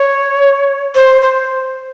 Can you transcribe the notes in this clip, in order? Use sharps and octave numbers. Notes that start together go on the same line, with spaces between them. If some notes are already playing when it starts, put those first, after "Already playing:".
Already playing: C#5
C5
C5